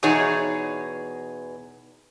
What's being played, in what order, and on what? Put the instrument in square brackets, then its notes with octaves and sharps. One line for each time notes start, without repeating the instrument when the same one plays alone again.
[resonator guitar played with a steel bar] E2 B2 D#4 G#4 C#5